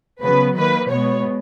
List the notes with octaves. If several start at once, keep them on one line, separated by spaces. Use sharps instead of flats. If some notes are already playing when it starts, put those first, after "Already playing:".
C#3 F#3 B3 B4
D#3 A#3 B4
B2 G#3 B3 C#5